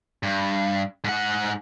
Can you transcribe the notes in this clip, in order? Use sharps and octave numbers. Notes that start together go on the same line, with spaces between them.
G2
G#2 F#5